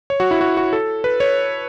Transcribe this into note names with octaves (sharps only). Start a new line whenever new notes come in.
C#5
F#4
E4
F#4
F#4
A4
B4
C#5